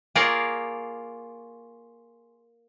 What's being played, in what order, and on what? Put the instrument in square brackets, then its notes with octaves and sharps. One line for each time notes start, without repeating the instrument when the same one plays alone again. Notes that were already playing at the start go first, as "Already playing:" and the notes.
[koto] A#3 F4 G#4 A#4 C#5 D5